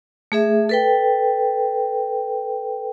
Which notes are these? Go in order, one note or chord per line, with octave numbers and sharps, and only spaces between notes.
A3 G#4 E5
A4 B4 G5